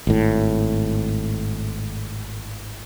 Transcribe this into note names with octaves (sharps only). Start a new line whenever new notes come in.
G#1 A2